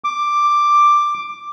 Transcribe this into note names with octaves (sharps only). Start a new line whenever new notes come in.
D6